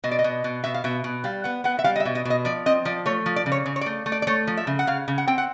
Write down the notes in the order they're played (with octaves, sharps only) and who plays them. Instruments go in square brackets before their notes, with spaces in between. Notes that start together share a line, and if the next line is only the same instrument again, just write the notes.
[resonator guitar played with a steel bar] B2 D#5
D5
D#5
B2
B2
B2 E5
F5
B2 E5
B2
G3 F5
B3 F#5
B3 F#5
E5
G3 F5
D#5
E5
B2
D#5
B2 D#5
F3 D5
C4 D#5
F3 D5
A3 C#5
F3
D5
C#3
C#5
C#3
C#5
D5
A3
A3
D5
D5
A3 C#5
F3
E5
C#3
F#5
C#3 F5
C#3
F#5
C4 G5
F#5